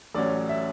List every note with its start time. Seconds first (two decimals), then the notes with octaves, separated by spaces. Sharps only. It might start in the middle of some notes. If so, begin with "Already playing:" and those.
0.15 A1 A2 F#3 C#4 D5
0.49 E5